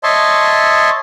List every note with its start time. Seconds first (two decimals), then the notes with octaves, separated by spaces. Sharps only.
0.03 C#5 D#5 E5 A5 C6 C#6